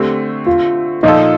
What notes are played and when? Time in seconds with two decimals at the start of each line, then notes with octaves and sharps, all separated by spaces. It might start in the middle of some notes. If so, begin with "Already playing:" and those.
Already playing: D3 A3 C4 G4
0.46 F4
1.03 A#2 F3 A#3 D#4 F4 A4